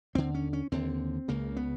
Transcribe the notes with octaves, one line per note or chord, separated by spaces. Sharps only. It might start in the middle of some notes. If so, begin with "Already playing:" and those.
D#2 D3 C4
C#4
C#4
D#2 D3 C4
C#2 C#3 A#3
B3